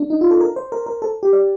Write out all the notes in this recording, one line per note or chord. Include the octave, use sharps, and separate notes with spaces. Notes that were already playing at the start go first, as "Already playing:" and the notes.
Already playing: D4
D#4
F4
A4
A#4
C5
A#4
A#4
A4
G4
D5